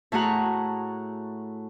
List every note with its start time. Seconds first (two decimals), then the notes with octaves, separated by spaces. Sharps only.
0.12 A2 A3 F#4 G#4 F#5 A#5